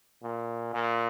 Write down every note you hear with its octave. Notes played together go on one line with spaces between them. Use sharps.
A#2
A#2